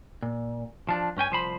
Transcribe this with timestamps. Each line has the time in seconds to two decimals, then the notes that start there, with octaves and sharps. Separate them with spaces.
0.22 A#2
0.89 F3 D4
1.17 G2 C#4 G5 G#5
1.30 C2 F3 C5 B5